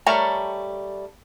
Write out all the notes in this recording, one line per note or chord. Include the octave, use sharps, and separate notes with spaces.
G3 A3 A#4 C#5 A#5